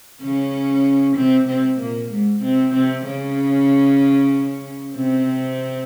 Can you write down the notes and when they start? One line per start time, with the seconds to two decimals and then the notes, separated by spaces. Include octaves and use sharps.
0.21 C#3 C#4
1.16 C3 C4
1.48 C3 C4
1.79 A#2 A#3
2.11 G#2 G#3
2.42 C3 C4
2.74 C3 C4
3.06 C#3 C#4
4.95 C3 C4